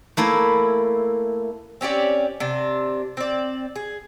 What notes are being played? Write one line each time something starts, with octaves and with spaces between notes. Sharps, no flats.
A3 A#3 E4
C4 C#4 G4 D5
C3 D4
C4 D5
G#4